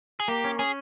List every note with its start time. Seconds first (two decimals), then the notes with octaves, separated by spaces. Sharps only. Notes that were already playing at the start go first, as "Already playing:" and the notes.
0.20 G#4
0.28 A#3 G4
0.44 C#4
0.59 C#4 G#4